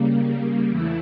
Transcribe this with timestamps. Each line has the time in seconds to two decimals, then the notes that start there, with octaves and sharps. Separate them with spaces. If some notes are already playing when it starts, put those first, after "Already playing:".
Already playing: C#3 G3 A#3
0.68 E2 C#3 E3 A3 E4